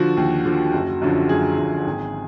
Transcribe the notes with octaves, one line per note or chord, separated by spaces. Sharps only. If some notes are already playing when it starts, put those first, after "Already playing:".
Already playing: D3 F3 F#4
D#2
D3 F3
F#1
F#2 D3 F3
F#1 G#4
F#2 D3 F3
G#1